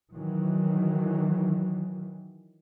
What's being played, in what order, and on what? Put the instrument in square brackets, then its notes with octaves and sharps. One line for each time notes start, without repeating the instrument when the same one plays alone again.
[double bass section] D#3 E3 F#3